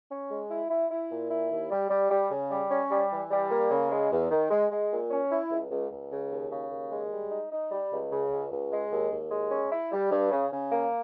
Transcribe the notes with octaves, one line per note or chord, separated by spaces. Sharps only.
C#4
G#3
E4
E4
E4
A#2
E4
D#2
G3
G3
G3
C#3
G3
C#4
G3
E3
G3
A#3
C#3
G#3
E2
D#3
G#3
G#3
A#2
C#4
E4
C#2
C#2
C#2
C#3
D#2
C#3
D#2
G#3
G3
D#4
D#4
G3
C#2
C#3
C#2
C#2
G#3
D#2
D#2
G#3
C#4
E4
G3
G2
C#3
C#3
A#3